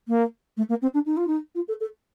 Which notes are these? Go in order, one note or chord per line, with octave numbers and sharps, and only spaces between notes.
A#3
A3
A#3
C4
D4
D#4
F4
D#4
F4
A4
A4